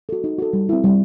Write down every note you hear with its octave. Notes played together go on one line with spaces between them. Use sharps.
F#4 A4
D#4
F#4 A4
G3
C4 E4
G3